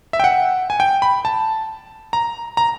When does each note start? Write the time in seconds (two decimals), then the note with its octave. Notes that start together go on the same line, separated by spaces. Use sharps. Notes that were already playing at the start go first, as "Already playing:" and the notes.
0.13 E5
0.20 G5
0.24 F#5
0.70 G#5
0.80 G5
1.02 B5
1.25 A5
2.13 A#5
2.57 A#5